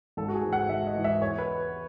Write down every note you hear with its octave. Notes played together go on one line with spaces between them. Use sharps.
G#1 A4
F#4
G#4
G#2 E3
F#5
G#1 E5
D#5
G#2 E3
E5
E2 C#5
B4